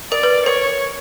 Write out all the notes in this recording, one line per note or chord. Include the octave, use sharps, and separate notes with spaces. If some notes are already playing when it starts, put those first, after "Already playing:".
A#4 D5
B4
A#4 C#5